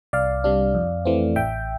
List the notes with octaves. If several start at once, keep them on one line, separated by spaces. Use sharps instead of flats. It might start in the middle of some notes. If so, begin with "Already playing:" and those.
C2 D5 F5
C3 G3 D4
F2
E3 A3 C4
A1 E5 G5